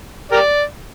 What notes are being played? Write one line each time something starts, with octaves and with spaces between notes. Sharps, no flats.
G4 A#4 D5